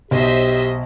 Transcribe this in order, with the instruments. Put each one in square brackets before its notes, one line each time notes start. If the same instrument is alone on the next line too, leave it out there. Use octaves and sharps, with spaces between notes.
[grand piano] B1 [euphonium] G4 [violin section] C5 D#5 E5